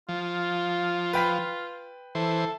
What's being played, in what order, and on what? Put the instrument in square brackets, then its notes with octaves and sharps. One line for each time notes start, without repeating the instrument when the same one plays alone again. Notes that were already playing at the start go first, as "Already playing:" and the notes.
[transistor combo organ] F3 [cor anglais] F4
[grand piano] B4 G5 B6
[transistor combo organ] E3 C5 [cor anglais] A4